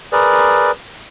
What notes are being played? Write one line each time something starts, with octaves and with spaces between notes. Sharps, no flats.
G#4 A#4 B4 D5